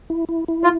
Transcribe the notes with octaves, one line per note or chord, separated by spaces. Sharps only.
E4
E4
E4
F4